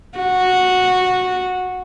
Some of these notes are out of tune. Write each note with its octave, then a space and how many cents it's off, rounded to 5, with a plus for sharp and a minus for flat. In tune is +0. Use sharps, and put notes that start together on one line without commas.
F#4 -10